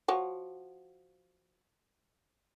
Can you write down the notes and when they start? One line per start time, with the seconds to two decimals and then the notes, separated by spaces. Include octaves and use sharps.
0.08 F3 F#4 C#5